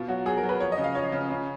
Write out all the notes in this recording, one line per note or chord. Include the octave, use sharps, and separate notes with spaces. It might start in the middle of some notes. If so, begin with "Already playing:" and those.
Already playing: B2 F4
F#3 F#4
F#3 G#4
A#4
F#3
B4
F3 C#5
D#5
C#3
F5
F3 C#5
C#3
C#3